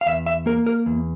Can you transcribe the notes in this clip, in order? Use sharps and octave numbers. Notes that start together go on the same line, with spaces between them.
F5
E2 E5
E5
A#3 A#4
A#4
E2